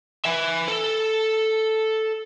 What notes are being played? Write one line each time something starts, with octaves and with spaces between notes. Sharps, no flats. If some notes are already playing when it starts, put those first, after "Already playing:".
E5 G#5
A4